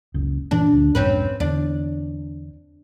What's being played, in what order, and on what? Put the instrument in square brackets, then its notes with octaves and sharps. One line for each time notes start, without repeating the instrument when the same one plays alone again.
[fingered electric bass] F#1 C#2
[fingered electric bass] F#2 A#2 E3 [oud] D4
[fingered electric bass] D2
[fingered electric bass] B1 F2 G#2 [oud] C4 C#4 B4
[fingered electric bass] E2 D3 [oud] D4